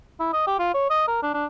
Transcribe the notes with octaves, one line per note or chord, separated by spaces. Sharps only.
E4
D#5
G4
F4
C#5
D#5
A#4
D4
D4